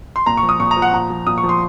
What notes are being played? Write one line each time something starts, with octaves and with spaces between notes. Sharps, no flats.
C6
A#2 A#5
C#6
F3
D#6
A#2 C#6
A#5
F3
F#5
A#2 A#5
F3
A#2 D#6
C#6
F3
C6